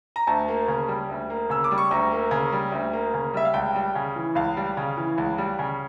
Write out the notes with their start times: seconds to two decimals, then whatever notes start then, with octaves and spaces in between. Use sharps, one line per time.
0.16 A#5
0.27 D2 A5
0.48 A#3
0.68 C#3
0.88 G3
1.09 D2
1.30 A#3
1.50 C#3 E6
1.64 D6
1.71 G3
1.78 C#6
1.91 D2 A#5
2.12 A#3
2.31 C#3
2.52 G3
2.72 D2
2.93 A#3
3.14 C#3
3.34 G3 E5
3.45 F5
3.54 C#2 G5
3.75 G3
3.95 C#3
4.16 E3
4.35 C#2 F5
4.57 G3
4.77 C#3
4.97 E3
5.18 C#2
5.38 G3
5.59 C#3